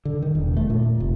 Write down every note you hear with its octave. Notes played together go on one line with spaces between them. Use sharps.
D3
D#3
E1
A3
A#2
F1